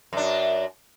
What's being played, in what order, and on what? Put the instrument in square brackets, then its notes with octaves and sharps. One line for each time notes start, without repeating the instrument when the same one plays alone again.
[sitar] F#2 D4